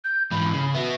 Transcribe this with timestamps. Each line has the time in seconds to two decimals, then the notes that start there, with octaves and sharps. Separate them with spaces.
0.04 G6
0.32 G#2 E3 B5
0.53 C#3
0.75 B3 F#4 E5